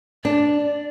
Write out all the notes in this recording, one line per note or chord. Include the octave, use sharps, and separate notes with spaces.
D4 D5